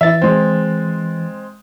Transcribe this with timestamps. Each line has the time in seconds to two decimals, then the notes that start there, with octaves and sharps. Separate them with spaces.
0.01 E3 E4 E5 A6
0.22 G#3 C4